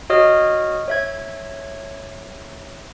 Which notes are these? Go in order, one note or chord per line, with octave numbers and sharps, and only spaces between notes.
F#4 C#5 D#5 D#6 F6
C#5 E5 G#6